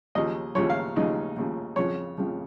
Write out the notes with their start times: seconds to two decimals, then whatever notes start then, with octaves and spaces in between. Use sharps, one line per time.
0.15 D#2 C#3 F3 D#5
0.55 D#2 C#3 F3 C#5
0.70 F5
0.96 D#2 C#3 F3 D#4
1.36 D#2 C#3 F3
1.76 F2 C#3 F3 C#5
2.18 F2 C#3 F3